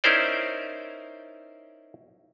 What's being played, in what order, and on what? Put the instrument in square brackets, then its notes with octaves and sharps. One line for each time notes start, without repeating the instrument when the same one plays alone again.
[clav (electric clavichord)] C#4 D#4 E4 A#4 C5 D5